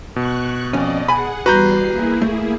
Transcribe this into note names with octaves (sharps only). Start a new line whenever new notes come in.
B2 C#6 F#6
F2 C#4 D5 D#5
G#4 F#5 G#5 B5
E2 G3 F#4 B4 A#5 G6 C7
A#3 E4 G#4
A3